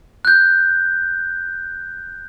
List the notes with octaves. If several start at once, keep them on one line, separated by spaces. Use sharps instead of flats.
F#6 G6